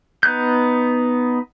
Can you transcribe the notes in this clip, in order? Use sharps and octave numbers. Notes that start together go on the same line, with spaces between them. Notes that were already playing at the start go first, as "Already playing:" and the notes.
B3 D#4 F#6 G6